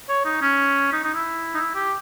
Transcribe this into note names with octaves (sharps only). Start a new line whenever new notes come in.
C#5
D#4
C#4
D#4
D#4
E4
D#4
E4
G4